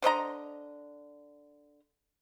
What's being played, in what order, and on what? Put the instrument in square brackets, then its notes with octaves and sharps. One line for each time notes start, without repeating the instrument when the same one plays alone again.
[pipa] D3 C5 D#5 A#5